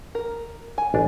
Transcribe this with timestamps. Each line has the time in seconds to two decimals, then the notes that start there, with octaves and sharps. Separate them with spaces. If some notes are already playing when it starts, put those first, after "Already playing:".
0.15 A#4
0.78 G#5
0.94 A1 D4